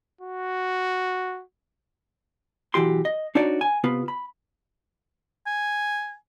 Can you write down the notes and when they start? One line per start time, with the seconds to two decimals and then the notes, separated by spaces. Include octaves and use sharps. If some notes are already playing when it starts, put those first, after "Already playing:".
0.21 F#4
2.74 B1 E3 F#4 G4 C6
3.05 D#5
3.35 D4 D#4 F#4 C#5 D5
3.61 G#5
3.84 C3 B3 F4 B4
4.08 B5
5.46 G#5